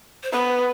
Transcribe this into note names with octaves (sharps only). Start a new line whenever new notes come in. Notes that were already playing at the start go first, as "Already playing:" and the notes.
C5
B3 B4